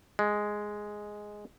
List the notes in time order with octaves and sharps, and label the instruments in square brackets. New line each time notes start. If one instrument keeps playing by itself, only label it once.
[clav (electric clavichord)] G#3